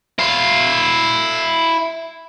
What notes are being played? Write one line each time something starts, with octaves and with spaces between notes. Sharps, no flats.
E4 F5